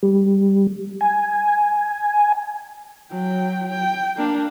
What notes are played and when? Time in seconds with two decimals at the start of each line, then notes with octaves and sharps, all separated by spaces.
0.03 G3
1.01 G#5
3.12 F#3 G5
3.69 G5
4.17 A#3 D4